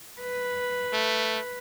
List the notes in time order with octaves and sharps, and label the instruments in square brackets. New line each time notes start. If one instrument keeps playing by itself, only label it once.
[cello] B4
[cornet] A3